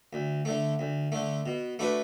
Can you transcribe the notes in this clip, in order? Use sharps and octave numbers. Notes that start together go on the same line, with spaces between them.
D2
D3 A3
D2
D3 A3
B2
A3 D4 F#4 B4